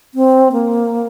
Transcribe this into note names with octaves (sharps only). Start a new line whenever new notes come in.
C4
A#3